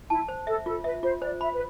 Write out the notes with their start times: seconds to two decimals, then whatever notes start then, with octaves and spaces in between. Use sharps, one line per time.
0.10 E4 A5
0.28 C5
0.47 A4 E5
0.66 F4 A4
0.84 B4 E5
1.03 F4 C5
1.22 C5 D5
1.41 E5 B5
1.53 B4